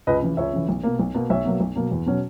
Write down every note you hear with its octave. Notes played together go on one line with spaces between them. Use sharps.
C#2 B4 D#5
C#3 E3
C#2 C#5 E5
C#3 E3
B1
B2 A#3
B1
B2 A#3
B1 C#5 E5
B2 F#3 A#3
B1
B2 F#3 A#3
E2
B2 F#3 C#4